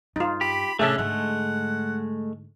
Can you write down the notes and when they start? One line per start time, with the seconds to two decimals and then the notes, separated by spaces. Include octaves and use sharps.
0.16 G2 D#4 F4
0.41 G4 B5
0.79 A1 C3 A3 C#4 D4 G#4 E5 A5
0.98 G#2 D3 G#3 A3 F#5